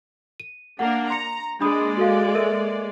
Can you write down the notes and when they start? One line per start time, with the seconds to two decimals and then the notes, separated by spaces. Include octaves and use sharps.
0.40 D#7
0.79 A#3 D4 A#4 F#5
1.10 A#5 C6 C#7
1.61 G#3 A#3 D4 D5 B5 D#6
1.97 F#4 A4 F5
2.35 A4 A#4 E5